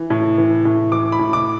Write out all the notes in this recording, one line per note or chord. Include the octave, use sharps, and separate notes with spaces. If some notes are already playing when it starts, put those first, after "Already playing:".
Already playing: E3
A2
E3
A2
E3 D6
B5
A2
D6